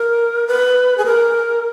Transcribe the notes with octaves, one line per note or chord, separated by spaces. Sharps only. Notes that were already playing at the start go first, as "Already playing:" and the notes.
Already playing: A#4
B4
G#4
A#4